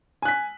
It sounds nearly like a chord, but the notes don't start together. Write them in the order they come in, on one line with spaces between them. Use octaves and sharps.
G#5 F#6 B6